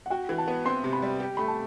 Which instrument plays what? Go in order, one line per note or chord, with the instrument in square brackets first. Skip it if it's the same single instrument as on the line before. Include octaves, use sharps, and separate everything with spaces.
[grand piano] F#5
[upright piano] F#4 [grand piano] G5
[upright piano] E3
[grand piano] A5
[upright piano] B3
[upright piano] C4 [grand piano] C6
[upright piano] C3
[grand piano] B5
[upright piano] G3
G4
[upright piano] A3 [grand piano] B5
[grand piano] A5